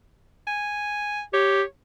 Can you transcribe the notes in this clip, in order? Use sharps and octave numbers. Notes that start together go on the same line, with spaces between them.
G#5
G4 C#5